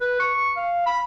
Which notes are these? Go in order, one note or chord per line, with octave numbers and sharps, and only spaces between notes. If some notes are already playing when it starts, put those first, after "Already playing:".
B4
C#6
F5
B5